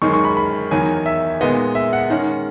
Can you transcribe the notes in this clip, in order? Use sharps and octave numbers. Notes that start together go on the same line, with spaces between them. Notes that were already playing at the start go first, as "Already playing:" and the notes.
F#2 D#3 G#3 C#6
C#6
B5
B5
E2 D#3 F#3 G#5
E5
A#2 G#3 B3 D#4 D#5
E5
F#5
D#3 G#3 C#4 F#5